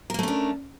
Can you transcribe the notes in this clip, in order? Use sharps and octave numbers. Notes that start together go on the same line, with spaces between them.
A3 A#3 C#4 D4 A#4